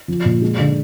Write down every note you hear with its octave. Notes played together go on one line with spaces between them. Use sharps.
F3
A#2
G#3
D3